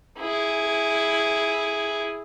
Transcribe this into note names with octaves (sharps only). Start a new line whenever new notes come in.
E4 G#4